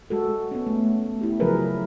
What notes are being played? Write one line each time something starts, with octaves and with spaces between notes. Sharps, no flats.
G#3 F#4 A4
B3 C#4
A3
E4 G4
C#3 F3 F#3 G#4 A#4 B4